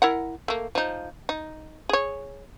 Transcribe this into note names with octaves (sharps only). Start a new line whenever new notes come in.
E4 A#4 F#5
A3 A#3
F3 D#4
D#4
G#4 C#5